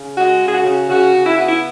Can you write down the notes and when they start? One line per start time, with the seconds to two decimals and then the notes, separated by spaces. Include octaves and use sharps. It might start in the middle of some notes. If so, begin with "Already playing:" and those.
Already playing: C#3
0.17 G#3 F#4
0.41 C#3
0.48 G#4
0.54 F#4
0.65 C#3
0.90 C#3 F#4
1.14 C#3
1.25 E4
1.37 B3 F#4
1.48 E4